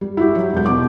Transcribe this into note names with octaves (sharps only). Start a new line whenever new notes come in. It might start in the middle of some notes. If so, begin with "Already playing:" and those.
G3
E4 F#4 G4
F#3
E1 G6
B2 D6